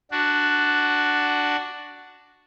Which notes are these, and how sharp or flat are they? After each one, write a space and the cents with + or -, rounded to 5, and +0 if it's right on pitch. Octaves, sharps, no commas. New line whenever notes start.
D4 +0 F#4 +0